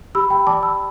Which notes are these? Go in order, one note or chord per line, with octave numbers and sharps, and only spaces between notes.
G4 B5 E6
G5 B5
D5 A5 D6
B5 E6